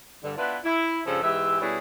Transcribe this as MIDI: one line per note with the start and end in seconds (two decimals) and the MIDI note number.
0.23 0.32 43
0.23 0.32 50
0.37 0.57 59
0.37 0.57 62
0.37 0.57 64
0.37 0.57 65
0.37 0.57 71
0.64 1.00 64
1.05 1.22 43
1.05 1.22 49
1.05 1.22 53
1.05 1.22 69
1.23 1.58 44
1.23 1.58 52
1.23 1.58 56
1.23 1.58 67
1.23 1.58 76
1.61 1.78 47
1.61 1.78 55
1.61 1.78 61
1.61 1.78 64
1.61 1.78 68
1.61 1.78 71